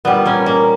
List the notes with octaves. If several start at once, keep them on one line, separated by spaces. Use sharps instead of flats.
A#2 G3 B3
A#3 C#4
A#3